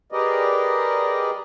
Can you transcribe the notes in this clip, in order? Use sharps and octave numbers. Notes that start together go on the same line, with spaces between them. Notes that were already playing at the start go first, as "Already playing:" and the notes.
G4 G#4 A#4 B4 D5 D#5